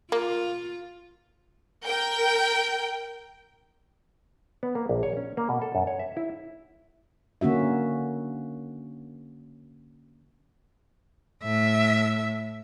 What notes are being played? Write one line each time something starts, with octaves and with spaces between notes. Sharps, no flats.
A#3 F4
A#4 G5
B3
A#3
A#1
C#5
C#4
A#3
B2
A4
F#2
C#5
E5
E4
D3 A#3 C#4 F#4 E5
A2 E5